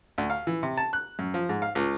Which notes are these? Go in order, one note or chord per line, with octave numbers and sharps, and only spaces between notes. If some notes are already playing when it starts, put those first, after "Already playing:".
D2
F5
E3
C3
A5
F#6
F#2
F3
G#2
F5
C#2